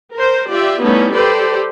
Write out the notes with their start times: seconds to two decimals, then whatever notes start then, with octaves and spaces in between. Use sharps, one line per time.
0.14 A#4 C5
0.49 F4 G4 D5 E5
0.82 G3 A3 B3 C#4 D#4 E4
1.13 G4 A4 B4 C5 D5